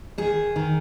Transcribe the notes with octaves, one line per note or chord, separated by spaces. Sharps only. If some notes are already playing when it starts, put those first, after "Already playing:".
D#3 G#4
D#3